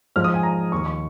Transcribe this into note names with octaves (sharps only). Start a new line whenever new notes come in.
G#2 F3 F6
D#6
G#5
A#5
D#2 D#3 C#6
C#6